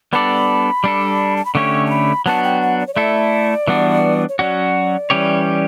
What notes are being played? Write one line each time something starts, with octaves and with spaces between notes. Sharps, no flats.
G3 B3 D4 A4 D5 B5
G3 D4 A4
A5
B5
D3 A3 C#4 G4 C#5 C#6
A5
B5
F#3 B3 D4 F#4 A5
G5
F#5
D5
C#5
A3 E4 A4 D5
E3 G3 B3 D4 F#4
C#5
F#3 C#4 F#4 D5
E3 G3 C#4 G4 C#5